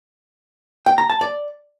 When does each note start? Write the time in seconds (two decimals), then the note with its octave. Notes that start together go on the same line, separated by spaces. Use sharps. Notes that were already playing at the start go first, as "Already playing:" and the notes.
0.86 G5
0.98 A#5
1.10 A5
1.21 D5